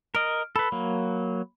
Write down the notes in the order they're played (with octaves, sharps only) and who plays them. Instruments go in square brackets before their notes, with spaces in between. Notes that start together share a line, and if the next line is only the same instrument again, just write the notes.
[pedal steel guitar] A#4 D#5 [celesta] F6 D7
[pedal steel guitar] A4 B4 [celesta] B5
[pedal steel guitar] F#3 A#3